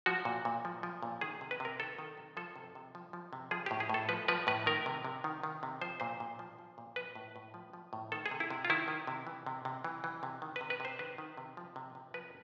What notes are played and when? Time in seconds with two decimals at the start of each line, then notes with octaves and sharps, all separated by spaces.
0.06 F3 F#4
0.25 A#2
0.45 A#2
0.65 F3
0.83 F3
1.03 A#2
1.21 D#3 G#4
1.41 C3
1.51 B4
1.60 C3 A#4
1.79 D#3 A4
1.98 D#3
2.18 C3
2.37 F3 A4
2.56 C3
2.75 C3
2.95 F3
3.13 F3
3.33 C3
3.51 F3 G#4
3.66 A2 G4
3.80 G#4
3.89 A2 A4
4.09 F3 B4
4.28 F3 B4
4.47 A2 B4
4.66 D#3 A#4
4.86 C3
5.04 C3
5.24 D#3
5.43 D#3
5.63 C3
5.81 F3 C5
6.00 A#2 C5
6.20 A#2
6.39 F3
6.59 F3
6.78 A#2
6.96 F3 B4
7.15 A2
7.36 A2
7.54 F3
7.73 F3
7.93 A2
8.12 D#3 A4
8.26 G#4
8.31 C3
8.40 E4
8.50 C3
8.65 F4
8.70 D#3 E4
8.88 D#3
9.07 C3
9.27 E3
9.46 C3
9.65 C3
9.84 E3
10.04 E3
10.23 C3
10.42 D#3
10.56 C3 B4
10.70 B4
10.80 C3 C5
10.99 D#3 B4
11.18 D#3
11.37 C3
11.57 F3
11.76 C3
11.95 C3
12.14 F3 B4